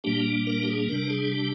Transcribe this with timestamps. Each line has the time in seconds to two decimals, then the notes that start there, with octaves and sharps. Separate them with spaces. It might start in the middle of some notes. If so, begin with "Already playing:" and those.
0.04 A#2 G3 A#3 D4 G4
0.47 A#4
0.63 G4
0.68 G#4
0.88 C3 G3 D4 A#4
1.10 G#4
1.31 G4